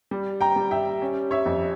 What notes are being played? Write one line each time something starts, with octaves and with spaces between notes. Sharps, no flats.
G3
G5 A#5
G3
E5 G5
C#4
C#5 E5
F2